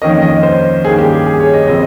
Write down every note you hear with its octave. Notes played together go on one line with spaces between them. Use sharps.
F2 D#3 A#3 C#4 D#5
D#5
C5
G2 D#3 A#3 C#4 G#4
G4
G#4
G#4
C#5
D#5
C#3 F3 C4 D#5